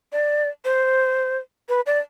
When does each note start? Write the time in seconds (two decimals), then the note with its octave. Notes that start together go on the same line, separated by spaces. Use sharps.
0.12 D5
0.65 C5
1.69 B4
1.86 D5